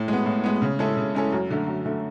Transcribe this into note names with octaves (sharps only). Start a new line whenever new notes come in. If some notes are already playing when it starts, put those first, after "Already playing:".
Already playing: A2
G#3 B3
A2
G#3 B3
C#3
G#3 C#4 E4 A4
C#3
G#3 C#4 E4 A4
F#2
D3 A3
F#2
D3 A3